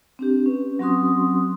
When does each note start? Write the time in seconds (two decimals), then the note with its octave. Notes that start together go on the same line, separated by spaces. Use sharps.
0.19 C4 D4 G4
0.46 C#4 B4
0.79 F#3 C4 C#4 F#4 C6 D#6